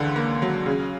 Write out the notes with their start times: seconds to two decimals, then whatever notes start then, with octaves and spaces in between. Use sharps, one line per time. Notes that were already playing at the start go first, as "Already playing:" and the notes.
Already playing: C#2 D3 E3 F#5
0.16 A#3
0.42 F#3
0.66 C#3